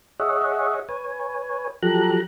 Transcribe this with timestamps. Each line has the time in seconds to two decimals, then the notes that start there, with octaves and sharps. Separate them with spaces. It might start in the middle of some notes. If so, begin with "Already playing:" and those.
0.20 G#4 C#5 D#5 E5 F#5
0.89 B4 C#5 G#5
1.83 F3 F#3 G4 A4 A#5 F#6